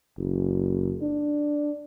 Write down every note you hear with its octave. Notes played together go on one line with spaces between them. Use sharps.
F#1
D4